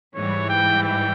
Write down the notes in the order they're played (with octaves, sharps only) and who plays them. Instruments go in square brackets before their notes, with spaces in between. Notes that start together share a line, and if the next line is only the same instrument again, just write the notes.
[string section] G#2 E3 G3 [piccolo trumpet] C#5
[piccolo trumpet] G5
G5